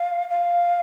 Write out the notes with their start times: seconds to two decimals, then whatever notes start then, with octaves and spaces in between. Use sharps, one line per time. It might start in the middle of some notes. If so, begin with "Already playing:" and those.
Already playing: F5
0.29 F5